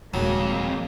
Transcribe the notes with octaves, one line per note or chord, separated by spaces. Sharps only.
D#1 F2 F#3 G#3 A#3